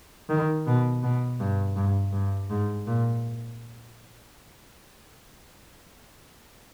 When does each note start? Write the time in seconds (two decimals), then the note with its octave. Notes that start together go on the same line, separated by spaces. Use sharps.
0.29 D#3
0.67 B2
1.03 B2
1.40 G2
1.76 G2
2.12 G2
2.50 G#2
2.87 A#2